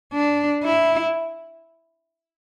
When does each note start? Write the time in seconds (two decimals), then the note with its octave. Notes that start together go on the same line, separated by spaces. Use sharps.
0.13 D4
0.64 E4